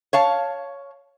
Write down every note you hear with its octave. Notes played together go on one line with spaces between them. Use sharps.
C#5 F5 A5